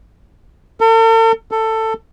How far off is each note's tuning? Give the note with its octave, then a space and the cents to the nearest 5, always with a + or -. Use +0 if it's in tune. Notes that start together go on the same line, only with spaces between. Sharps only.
A4 +45
A4 +15